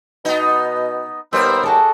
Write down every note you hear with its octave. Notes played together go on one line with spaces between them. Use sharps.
B2 B3 D#4
D#2 G3 B3 A#4 C5 E6
F#4 G#4 A4 D5